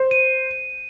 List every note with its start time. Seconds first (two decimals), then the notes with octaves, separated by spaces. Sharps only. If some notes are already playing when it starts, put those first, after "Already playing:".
Already playing: C5
0.11 D#7